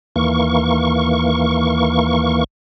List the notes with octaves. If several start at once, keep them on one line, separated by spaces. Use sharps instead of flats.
D#2 E3 A#3 C#6